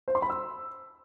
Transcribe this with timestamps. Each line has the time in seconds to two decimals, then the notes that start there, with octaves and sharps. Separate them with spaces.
0.08 C5
0.15 C6
0.22 B5
0.30 E6